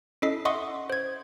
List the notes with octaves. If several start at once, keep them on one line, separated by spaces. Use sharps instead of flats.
C#4 E4 A4 D#5 B6 C7
D#5 E5 F#5 C6 C#6 D#6
C5 G#6